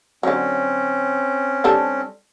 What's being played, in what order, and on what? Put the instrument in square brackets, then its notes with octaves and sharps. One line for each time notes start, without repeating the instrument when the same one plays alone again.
[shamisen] D3 F#3 [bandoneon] C4 C#4
[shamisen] G3 D4 A4